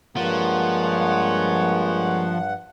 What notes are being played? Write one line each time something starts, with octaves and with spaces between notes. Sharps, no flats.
G2 F3 G#3 A#3 C#5 F#5